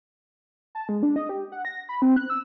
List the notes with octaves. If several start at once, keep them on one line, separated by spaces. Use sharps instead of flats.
A5
G#3
D4
D#5
G4
F#5
A#6
B5
C4
F#6
E6